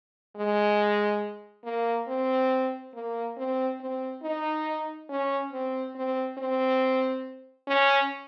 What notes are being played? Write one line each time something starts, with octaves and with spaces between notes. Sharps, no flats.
G#3
A#3
C4
A#3
C4
C4
D#4
C#4
C4
C4
C4
C#4